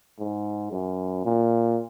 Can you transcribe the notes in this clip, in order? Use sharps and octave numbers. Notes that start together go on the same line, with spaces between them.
G#2
F#2
A#2